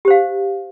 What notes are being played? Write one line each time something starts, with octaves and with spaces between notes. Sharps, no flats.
G4 C5 F5